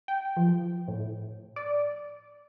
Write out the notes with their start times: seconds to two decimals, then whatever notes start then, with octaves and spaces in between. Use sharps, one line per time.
0.08 G5
0.36 F3
0.88 A2
1.56 D5